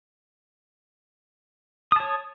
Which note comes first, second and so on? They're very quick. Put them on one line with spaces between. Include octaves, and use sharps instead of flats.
D#6 A5 C#5